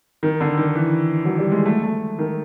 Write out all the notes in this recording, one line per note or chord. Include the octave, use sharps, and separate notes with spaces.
D#3
D3
D#3
E3
F#3
G3
G#3
A3
A3
D#3